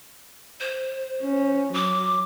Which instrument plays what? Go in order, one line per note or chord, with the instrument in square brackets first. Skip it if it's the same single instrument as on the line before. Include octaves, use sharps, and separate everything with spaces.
[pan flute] C5
[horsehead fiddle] C#4
[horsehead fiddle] F#3 [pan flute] D6